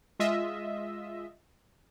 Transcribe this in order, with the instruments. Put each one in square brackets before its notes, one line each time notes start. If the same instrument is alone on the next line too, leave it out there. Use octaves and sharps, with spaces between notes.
[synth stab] G#3 F4 D#5 E5